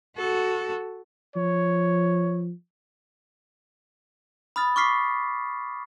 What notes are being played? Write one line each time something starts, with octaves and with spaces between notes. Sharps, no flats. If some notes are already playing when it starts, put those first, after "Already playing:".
F#4 A4
F3 C#5
B5 D#6 F6 A6
C#6 D6 F6 B6 C7